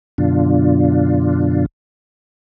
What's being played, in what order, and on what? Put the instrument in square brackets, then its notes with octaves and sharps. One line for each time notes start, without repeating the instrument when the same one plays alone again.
[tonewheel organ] F#2 B2 D3 D4 F4